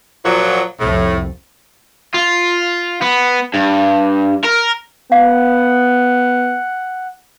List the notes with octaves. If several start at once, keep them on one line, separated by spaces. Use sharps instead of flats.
A#2 F3 F#3
C2 F2 A2
F4
B3
G2
A#4
B3 F5 F#5